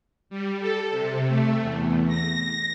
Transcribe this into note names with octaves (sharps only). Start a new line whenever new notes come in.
G3
A4
C3
A3
E2
A#6